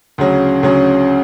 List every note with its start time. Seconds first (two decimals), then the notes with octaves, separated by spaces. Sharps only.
0.18 D2 C#3 F#3 C#4
0.63 D2 C#3 F#3 C#4